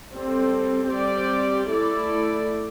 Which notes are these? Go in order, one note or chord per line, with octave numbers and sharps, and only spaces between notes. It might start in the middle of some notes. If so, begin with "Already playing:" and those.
G3 C4 A4
G3 C4 G4 D5
A3 E4 A4 D5